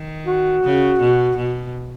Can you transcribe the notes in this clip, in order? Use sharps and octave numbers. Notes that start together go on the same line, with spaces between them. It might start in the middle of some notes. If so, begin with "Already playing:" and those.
Already playing: D#3
F#4
C#3
B2
B2